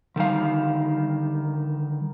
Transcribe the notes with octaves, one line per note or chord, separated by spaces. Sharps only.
D3 D#3 G3 F5